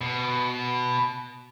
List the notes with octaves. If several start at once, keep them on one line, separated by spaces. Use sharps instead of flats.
B2